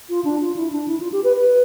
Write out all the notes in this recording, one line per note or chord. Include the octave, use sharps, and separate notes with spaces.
F4
D4
F4
E4
D4
E4
F4
G4
B4
B4